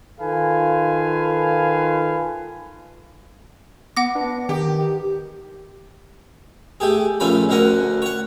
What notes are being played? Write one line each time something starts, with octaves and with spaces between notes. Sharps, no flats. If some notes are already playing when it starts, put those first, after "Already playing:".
D#3 F4 A4 B4 F5 G#5
B3 F#5 D6 A#6
D4 B4
D#3 G4
A3 G4 G#4
A#1 A3 C#4 F4 B5
D2 D3 C#4 A#4 F#5
C#5 F#5